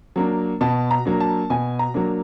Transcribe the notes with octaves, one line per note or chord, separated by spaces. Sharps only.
F#3 A#3 D4
B2 A5
A#5
F#3 A#3 D4
A5
B2 G#5
A#5
F#3 A#3 D4